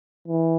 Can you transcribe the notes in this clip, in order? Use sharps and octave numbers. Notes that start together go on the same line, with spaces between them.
E3